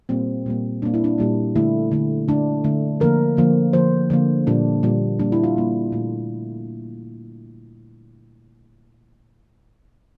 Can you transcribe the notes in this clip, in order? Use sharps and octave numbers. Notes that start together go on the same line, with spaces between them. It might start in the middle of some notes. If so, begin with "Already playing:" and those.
A#2 G3 A#3 C4
A#2 G3 A#3
A#2 G3 A#3 D4
E4
D4
A#2 G3 A#3
D3 A3 E4
D3 A3
D3 A3 D4
D3 A3
D3 F3 A#3 A#4
D3 F3 A#3
D3 F3 A#3 C5
D3 F3 A#3
A#2 G3 A#3 D4
A#2 G3 A#3
A#2 G3 A#3 D4
E4
F4
A#2 G3 A#3
A#2 A3